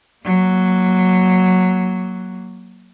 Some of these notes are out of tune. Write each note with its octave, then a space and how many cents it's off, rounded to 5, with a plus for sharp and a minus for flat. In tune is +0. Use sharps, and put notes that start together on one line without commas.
F#3 +0 A#3 +0